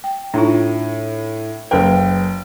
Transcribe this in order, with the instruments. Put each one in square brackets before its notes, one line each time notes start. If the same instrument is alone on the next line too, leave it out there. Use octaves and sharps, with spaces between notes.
[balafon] G5
[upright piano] A2 [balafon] D4 D#4 F4
[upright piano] F#1 G5 [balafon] C#4 A#4 B4